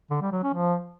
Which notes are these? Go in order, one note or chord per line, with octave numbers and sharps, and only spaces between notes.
D3
G3
F#3
C#4
F3